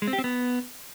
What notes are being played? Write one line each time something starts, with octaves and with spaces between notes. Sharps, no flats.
G#3
C4
G4
C4
B3